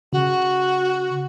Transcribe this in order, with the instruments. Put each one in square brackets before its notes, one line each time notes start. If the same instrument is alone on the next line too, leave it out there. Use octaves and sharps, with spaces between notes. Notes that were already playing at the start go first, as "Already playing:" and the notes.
[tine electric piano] C#3 [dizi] F#4